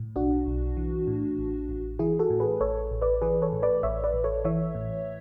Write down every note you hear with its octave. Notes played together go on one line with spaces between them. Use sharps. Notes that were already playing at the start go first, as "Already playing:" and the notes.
Already playing: A2
B1 D4 F#4
B1
E3
A2
A1
A1
E3 E4 G#4
F#4 A4
A2
G#4 B4
A1 A4 C#5
A1
B4 D5
E3 G#4 B4
A4 C#5
A2
B4 D5
A1 C#5 E5
B4 D5
A1
A4 C#5
E3 C#5 E5
A2